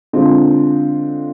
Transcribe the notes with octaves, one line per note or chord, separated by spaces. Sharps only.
D3 G#3 C4 F4